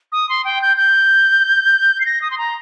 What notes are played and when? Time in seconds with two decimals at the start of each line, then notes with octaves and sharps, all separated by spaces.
0.12 D#6
0.29 C6
0.45 G5
0.62 G6
0.77 G6
2.00 C7
2.06 A#6
2.22 D#6
2.31 C6
2.38 A#5